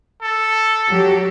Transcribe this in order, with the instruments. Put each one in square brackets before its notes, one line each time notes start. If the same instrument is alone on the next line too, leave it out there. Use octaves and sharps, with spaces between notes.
[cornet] A4
[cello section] F#3 F#4 G4